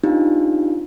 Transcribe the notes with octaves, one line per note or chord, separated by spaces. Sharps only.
C4 D4 D#4 F4 G4